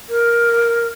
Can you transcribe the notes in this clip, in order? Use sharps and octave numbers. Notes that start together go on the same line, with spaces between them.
A#4